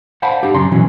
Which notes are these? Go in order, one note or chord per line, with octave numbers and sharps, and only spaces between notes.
C5 D5 F5 F#5 A5 B5
D4 G4 D5
F#2 C#3 A#5 C6
B2 E3 F#3 C#4